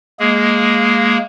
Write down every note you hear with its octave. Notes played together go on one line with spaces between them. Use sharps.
G#3 A#3 G#4